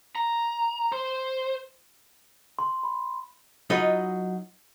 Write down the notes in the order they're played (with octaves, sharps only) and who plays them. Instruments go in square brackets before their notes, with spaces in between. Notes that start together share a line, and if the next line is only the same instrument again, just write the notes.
[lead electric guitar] A#5
C5
[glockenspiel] C6
B5
[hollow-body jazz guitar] F#3 D#4 F4 F#4 B4 D#5